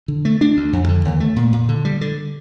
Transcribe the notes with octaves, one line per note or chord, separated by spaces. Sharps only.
D3
A3
D4
D2
F2
D3
D#2
A3
A#2
A#2
D3
G3
D3